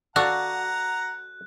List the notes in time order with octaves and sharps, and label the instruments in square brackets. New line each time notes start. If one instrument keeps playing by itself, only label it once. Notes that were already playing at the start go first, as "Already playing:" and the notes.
[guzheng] F#4 [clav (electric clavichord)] A4 D5 F5 [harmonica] F#5 A#5 [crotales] F#6